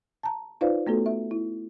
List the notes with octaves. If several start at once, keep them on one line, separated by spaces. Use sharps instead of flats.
A5 A#5
D#4 F4 B4 C5 D5 F5
A3 B3 F#4 A4
E5
E4